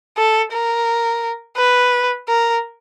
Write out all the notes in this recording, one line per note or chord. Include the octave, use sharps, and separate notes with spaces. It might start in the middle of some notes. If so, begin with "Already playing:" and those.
A4
A#4
B4
A#4